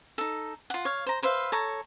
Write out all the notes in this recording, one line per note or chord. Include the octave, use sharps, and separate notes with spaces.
D#4 A4
F4 F#5
C#5 F5
C5 A#5
B4 C5 E5 F5
A4 C#5 A#5